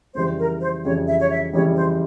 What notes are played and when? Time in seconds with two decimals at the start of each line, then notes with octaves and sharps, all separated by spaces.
0.15 F2 C#3 E3 G3 C5
0.38 A#4
0.61 C5
0.84 F2 C#3 E3 G3 C#5
1.08 E5
1.20 C#5
1.31 E5
1.53 F2 C#3 E3 G3 C#5
1.76 C5